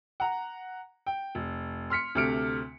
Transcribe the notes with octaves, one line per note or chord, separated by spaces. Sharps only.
F#5 A#5
G5
F1
C6 F6 B6 C#7
D2 C3 A3 F6 C#7 D7